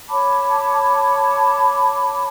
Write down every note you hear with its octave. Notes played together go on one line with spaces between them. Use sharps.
C#5 A5 B5 D6